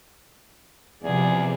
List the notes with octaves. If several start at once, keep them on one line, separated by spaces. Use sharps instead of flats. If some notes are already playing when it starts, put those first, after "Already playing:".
E2 C3 F3 G#4 D5